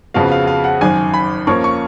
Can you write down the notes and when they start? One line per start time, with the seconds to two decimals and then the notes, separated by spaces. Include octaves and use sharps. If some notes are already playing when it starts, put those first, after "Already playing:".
0.14 F2 C#3 F3 B3 F#4 F5
0.32 F5
0.47 F5
0.64 F#5
0.81 G#1 F#2 D#3 G#5
1.14 B5
1.47 F2 F3 A#3 C#4 C#6
1.64 C#6